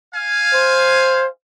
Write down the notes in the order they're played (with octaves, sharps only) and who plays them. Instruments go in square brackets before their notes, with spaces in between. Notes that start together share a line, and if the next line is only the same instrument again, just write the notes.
[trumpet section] F5 G#5
[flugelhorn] C5